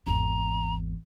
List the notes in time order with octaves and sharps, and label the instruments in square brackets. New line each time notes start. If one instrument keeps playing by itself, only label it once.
[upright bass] G#1 E2 [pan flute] A#5